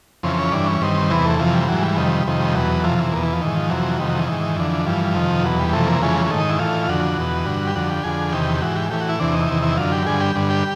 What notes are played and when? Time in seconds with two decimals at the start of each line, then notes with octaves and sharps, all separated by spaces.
0.23 F2 C#3 E3 C4
0.39 C#4
0.52 G2 E3 D4
0.67 C#4
0.81 G2 D#3 C4
1.10 E2 C3 E3 B3
1.25 A3
1.39 F2 C3 E3 F3
1.54 G3
1.68 G#2 E3 F#3
1.82 G3
1.97 F2 C3 D#3
2.27 F2 C3 D#3
2.40 G3
2.55 E2 B2 F#3
2.84 F2 C3 E3 F3
2.98 E3
3.12 E2 B2 A#3
3.23 E3
3.33 F3
3.41 G#2 D#3 E3
3.56 F3
3.70 F2 C3 E3 F#3
3.99 F2 C3 D#3 G3
4.09 F#3
4.19 E3
4.28 G#2 D#3
4.57 F2 D3
4.86 G2 E3 F3
5.15 F2 C3 D#3
5.43 E2 B2 F#3
5.59 G3
5.73 F2 C3 E3 A3
5.87 A#3
6.01 F2 C#3 E3 G#3
6.26 G#3
6.30 G#2 D#3 A3
6.40 D#4
6.50 E4
6.59 A2 E3 F4
6.88 F2 D3 F#4
7.17 E2 B2
7.46 G2 D3
7.67 G4
7.75 F2 D3 F#4
7.90 G4
8.04 F2 D3 G#4
8.32 E2 C3 D#3 G4
8.61 G#2 E3 F#4
8.76 G4
8.90 A2 E3 G4
9.01 F#4
9.09 E4
9.20 E2 C3 E3 D4
9.34 D#4
9.48 E2 C3 D#3 E4
9.63 E4
9.77 F#2 D3 F4
9.92 G4
10.07 G2 D3 G#4
10.21 G4
10.35 G2 D3
10.50 G4